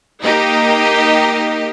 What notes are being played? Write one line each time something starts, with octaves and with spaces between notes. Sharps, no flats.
A#3 D#4 G4 D#5